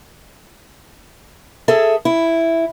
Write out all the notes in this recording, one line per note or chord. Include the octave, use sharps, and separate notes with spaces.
G#4 A4 E5
E4